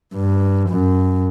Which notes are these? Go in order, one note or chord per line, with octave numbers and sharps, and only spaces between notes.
G2
F#2